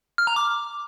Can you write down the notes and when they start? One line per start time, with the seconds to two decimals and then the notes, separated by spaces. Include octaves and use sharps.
0.18 F6
0.27 A#5
0.36 D6